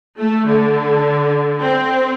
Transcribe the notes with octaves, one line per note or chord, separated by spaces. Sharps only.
A3
D3
C4